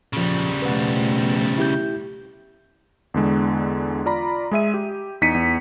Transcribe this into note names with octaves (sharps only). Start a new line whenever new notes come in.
A#2 C#3 F3 G3
B2 F3 A3 B4 F#5
E4 G4 G6
E2 D3 G#3
F4 D5 A#5 B5
G#3 G#4 E5 D#7
G4
E2 D#4 B6 C#7 D#7
E2